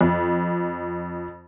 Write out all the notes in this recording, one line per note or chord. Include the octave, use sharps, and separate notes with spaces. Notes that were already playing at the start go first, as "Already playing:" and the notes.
F2